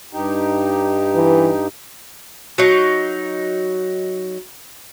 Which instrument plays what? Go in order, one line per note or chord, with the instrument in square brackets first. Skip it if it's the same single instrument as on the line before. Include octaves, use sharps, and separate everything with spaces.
[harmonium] G2 D#4 G4
[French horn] E3
[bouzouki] F#3 D#4